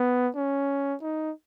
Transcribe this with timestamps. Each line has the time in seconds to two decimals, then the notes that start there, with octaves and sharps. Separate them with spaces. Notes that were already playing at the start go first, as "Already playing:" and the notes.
Already playing: B3
0.36 C#4
1.02 D#4